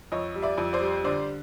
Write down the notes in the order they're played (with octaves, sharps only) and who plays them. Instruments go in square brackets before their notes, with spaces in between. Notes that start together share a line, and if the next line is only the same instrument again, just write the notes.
[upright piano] F2 C#5 D#5
G3
D5 E5
F2
C5 D5
G3
D3 C5 D5